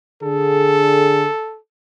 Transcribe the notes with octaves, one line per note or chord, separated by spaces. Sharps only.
D3 G#4 A4